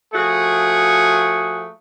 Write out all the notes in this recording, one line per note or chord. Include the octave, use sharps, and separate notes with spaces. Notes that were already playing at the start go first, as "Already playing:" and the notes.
F3 A3 F#4 G#4